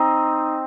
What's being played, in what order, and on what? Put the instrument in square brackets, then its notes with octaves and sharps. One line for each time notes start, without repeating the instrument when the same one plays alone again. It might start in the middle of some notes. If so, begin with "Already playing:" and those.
Already playing: [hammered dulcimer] C4 D#4